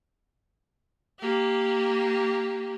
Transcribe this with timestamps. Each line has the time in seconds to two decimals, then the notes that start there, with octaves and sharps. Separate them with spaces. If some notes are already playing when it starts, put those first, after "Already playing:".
1.19 A#3 G4